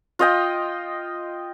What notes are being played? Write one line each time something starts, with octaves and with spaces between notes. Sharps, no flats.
F4 D#5 G5